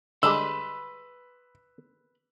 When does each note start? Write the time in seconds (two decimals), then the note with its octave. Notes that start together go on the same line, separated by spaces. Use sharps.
0.23 D3 G3 G#3 B4 B5 C6 E6